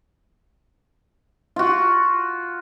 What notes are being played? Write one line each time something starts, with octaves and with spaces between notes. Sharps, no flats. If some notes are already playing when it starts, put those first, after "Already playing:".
F4 F#4